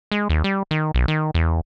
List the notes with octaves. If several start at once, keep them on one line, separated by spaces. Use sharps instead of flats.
G#3
D#2
G3
D#3
B1
D#3
E2